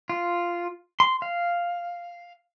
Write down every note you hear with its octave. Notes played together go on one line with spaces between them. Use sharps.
F4
C6
F5